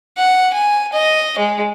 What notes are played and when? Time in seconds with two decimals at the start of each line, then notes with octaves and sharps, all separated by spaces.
0.18 F#5
0.53 G#5
0.93 D#5
1.38 G#3